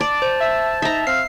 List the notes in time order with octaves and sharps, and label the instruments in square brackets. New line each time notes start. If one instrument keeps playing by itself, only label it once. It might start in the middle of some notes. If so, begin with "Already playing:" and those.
[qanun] D5 [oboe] A5
[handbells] C5
[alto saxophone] E5
[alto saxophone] D#4 [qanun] E5 A#5
[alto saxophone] C4 [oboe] F5 [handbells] C7